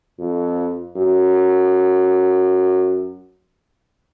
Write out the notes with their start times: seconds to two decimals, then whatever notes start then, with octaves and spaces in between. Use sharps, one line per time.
0.19 F2
0.97 F#2